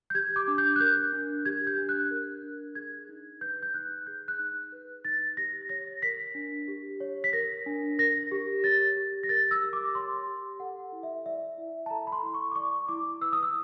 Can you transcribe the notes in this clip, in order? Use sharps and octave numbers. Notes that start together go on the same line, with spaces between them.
G6
G4 G#6
D6
D4
G6
F#6
A#4 G6
D4
G4 G#6
G6
D4
F#6
A#4
D4
G#4 G#6
D#4
B4 G6
G6
D#4 F#6
G#4 G6
F#6
D#4
B4
D#4 A6
G4 A#6
C#5 A#6
A#4 B6
D4
G4
C#5
B6
A#4 A#6
D4
A#4 A#6
G4
C#5 A6
G4
A#6
A#4 A6
E6
G4
D6
C#5 C6
G4
A4 F#5
E4
E5
D5 E5
E4
A5
A4 A#5
B5
C6
E4
C#6
D6
D5 C#6
E4 D6
B4 E6
D#6
E6